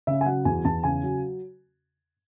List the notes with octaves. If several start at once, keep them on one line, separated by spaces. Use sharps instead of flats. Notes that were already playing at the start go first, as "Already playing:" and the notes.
C#3 E5
G#5
F#3 F#5
E2 G#5
E2 A5
C#3 G#5
F#3